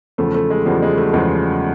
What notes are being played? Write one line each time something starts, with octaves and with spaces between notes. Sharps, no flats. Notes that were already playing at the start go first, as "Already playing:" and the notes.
E2 C#3 F3 A3
A3
G#3
E2 C#3 F3 G3
G#3
A3
E2 C#3 F3 G#3